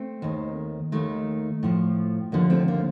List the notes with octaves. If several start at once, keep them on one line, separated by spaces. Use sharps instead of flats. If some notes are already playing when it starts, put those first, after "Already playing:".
Already playing: A3 C4
D#2 D#3
D#2 D#3 A3
A2 F3
D#2 D3 F3 A#3
A3 C4
A#3